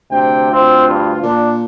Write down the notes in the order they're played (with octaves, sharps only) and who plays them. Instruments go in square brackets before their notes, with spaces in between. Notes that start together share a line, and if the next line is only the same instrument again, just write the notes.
[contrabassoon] D2 [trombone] C3 [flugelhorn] G5
[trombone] C4 [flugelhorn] F4
[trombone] G2
[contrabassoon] A#2 [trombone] D4